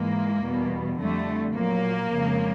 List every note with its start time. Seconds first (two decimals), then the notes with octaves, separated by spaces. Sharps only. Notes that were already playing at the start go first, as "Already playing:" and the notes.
Already playing: G#2 E3 G#3 A#3
0.44 E2 B2 G3
0.99 F2 D3 G3 A3
1.55 A#2 F#3 A#3
2.11 F2 C#3 F3 G#3